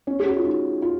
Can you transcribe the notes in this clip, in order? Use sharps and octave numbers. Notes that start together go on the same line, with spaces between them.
C#4
G#4
F#4
F4
D#4
F4